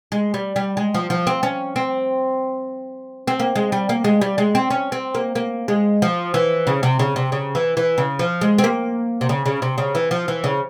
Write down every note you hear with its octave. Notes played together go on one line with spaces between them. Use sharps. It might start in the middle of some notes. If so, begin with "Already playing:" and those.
G#3
G3
G3
G#3
F3
F3
C4
C#4
C4
C4
A#3
G#3
G3
A#3
G#3
G3
G#3
C4
C#4
C4
A#3
A#3
G#3
F3
E3
C#3
C3
C#3
C3
C#3
E3
E3
C#3
F3
G#3
C4
A#3
C3
C#3
C#3
C3
C#3
E3
F3
E3
C#3